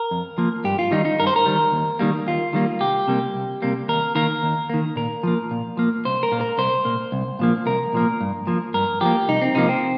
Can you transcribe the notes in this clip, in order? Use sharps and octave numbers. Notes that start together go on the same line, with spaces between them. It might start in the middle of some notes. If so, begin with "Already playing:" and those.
Already playing: A#4
F2
F3 A#3
G2 G4
F4
D#3 G3 D#4
D#4
G2 A#4
C5
A#4
D#3 G3
D#2
D#3 G3 A#3
D#2 F4
D#3 G3 A#3
C2 G4
C3 G3 A#3
C2
C3 G3 A#3
D#2 A#4
D#3 A#3 A#4
D#2
D#3 A#3
A#2 A#4
F3 A#3
A#2
F3 A#3
C2 C5
A#4
A#2 A#3
A#4
C2 C5
A#2 A#3
C2
A#2 F3 A#3
C2 A#4
A#2 F3 A#3
G2
F3 A#3
G2 A#4
F3 A#3 G4
C2 D#4
C4
C3 F3 A#3 D#4
C4